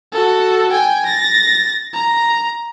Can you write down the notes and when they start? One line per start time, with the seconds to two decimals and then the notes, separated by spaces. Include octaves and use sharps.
0.12 F#4 A4
0.71 G5 G#5
1.06 A6 A#6
1.93 A#5